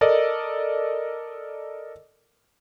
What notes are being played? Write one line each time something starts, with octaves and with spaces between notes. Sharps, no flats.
A4 A#4 D5 D#5